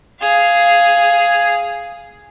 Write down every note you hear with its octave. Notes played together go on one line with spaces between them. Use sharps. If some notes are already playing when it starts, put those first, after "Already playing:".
G#4 F5